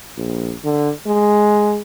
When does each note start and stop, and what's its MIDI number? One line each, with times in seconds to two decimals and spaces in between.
0.18 0.54 34
0.65 0.91 50
1.07 1.81 56